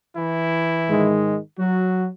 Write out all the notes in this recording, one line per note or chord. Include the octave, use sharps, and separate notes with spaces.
E3 E4
G#2 D#3 G#3
F#3 F#4